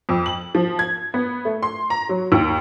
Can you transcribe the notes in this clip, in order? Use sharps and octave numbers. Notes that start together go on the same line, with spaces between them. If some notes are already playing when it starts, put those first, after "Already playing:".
F2
F#7
F3
G#6
B3
A3
C6
A#5
F#3
D#2